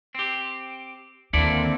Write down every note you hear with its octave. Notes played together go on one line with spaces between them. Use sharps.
C4 G4
D#2 D3 A#3 C4 E4 A4 D5